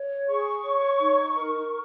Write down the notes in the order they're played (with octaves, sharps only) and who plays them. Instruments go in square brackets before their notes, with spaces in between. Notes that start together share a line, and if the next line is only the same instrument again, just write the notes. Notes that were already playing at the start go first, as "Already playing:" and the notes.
Already playing: [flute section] C#5
G#4 C#6
C#5
D#4
A#4